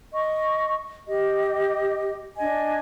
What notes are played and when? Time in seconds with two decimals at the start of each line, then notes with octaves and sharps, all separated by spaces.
0.12 D#5 C#6
1.07 G4 D#5
2.38 D4 D#5 G#5